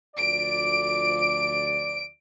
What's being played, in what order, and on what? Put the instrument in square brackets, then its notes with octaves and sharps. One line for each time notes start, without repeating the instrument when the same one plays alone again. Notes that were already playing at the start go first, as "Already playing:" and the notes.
[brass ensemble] D2 F3 D5 [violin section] D7